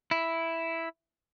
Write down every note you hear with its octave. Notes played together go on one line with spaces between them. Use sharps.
E4